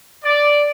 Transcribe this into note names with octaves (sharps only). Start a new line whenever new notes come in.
D5